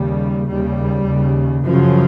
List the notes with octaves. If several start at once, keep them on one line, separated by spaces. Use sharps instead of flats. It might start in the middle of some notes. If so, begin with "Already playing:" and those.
Already playing: D#2 C#3 G3
D#2 C#3 G3
D#2 C#3
F#2 C#3 F3